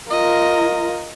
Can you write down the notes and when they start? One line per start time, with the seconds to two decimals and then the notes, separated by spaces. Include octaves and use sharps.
0.10 F4 A#4 D#5